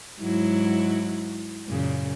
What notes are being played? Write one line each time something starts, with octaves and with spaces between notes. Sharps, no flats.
G#2 F#3 E4
F#2 A#2 C#3